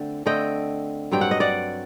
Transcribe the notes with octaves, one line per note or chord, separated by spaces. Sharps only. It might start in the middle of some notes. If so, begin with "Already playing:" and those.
Already playing: D3 A3 C4 D5
D3 A3 C4 D#5 G5
G2 F#3 C4 G5
F#5
D#5
D5 F#5